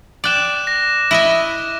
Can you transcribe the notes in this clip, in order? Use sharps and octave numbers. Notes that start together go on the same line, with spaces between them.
D5 G5 D6 F#6 E7
A#6
E4 D#5 E5